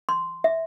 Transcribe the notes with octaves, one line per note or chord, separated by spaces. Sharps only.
C6
E5